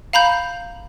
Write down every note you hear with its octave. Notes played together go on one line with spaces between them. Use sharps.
F5 A#5 B5 G6